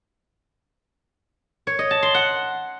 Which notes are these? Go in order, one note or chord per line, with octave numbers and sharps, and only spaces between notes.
C#5
D#5
A5
C6
F#5